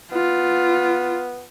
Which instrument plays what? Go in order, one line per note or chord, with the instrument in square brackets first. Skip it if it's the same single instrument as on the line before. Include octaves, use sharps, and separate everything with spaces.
[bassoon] B3 [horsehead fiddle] F4